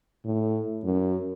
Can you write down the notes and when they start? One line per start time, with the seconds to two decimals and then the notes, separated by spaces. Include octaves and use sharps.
0.25 A2
0.84 F#2